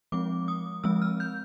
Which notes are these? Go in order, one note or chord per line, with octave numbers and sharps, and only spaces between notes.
F3 G#3 C4 D6
D#6
F3 G#3 C4 E6
F6
G6